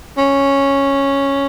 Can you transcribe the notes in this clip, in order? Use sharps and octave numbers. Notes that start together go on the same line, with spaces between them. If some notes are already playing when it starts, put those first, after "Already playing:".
C#4